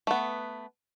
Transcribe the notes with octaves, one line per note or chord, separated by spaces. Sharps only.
A3 B3